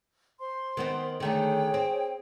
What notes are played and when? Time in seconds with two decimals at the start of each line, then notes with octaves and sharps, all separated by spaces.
0.41 C5 C6
0.77 D#3 B3 C4
1.20 D3 D#3 A3 G#4 C#5 G5
1.74 C4